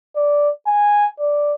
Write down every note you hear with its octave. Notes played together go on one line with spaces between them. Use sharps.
D5
G#5
D5